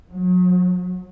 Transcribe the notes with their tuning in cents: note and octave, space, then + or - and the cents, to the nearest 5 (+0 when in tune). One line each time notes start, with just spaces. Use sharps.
F#3 -35